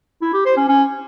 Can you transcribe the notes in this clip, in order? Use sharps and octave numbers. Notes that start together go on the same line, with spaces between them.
E4
G4
C5
C#4
C#4